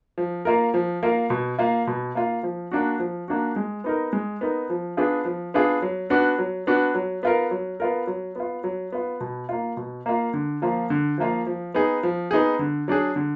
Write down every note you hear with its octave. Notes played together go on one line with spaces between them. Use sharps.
F3
A#3 F4 A#4
F3
A#3 F4 A#4
B2
A#3 F4
B2
A#3 F4
F3
A#3 D4 F#4
F3
A#3 D4 F#4
G#3
B3 D#4 A#4
G#3
B3 D#4 A#4
F3
B3 D4 F4 G#4
F3
B3 D4 F4 G#4
F#3
B3 D4 F#4
F#3
B3 D4 F#4
F#3
B3 F4 A#4
F#3
B3 F4 A#4
F#3
B3 F4
F#3
B3 F4
B2
A#3 F4
B2
A#3 F4
D3
F3 A#3 F4
D3
F3 A#3 F4
F3
B3 D#4 G#4
F3
B3 D#4 G#4
D3
F#3 D4 G#4
D3